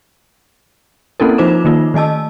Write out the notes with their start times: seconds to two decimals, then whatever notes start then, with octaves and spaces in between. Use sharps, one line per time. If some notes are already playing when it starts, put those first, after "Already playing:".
1.20 A#3 C4 C#4 E4 A4 A#4
1.38 F3 D#4 F4 C5 D6 E7
1.65 D#3 A#3 D#4 F4
1.94 D#3 A3 D#5 A5 E6